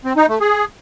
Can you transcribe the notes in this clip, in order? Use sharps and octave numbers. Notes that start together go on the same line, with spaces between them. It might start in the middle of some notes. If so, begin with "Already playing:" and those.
C4
D#4
A3
G#4